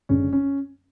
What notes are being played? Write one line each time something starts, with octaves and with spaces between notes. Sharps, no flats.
F#1 F#2 D3 G#3 C#4
C#4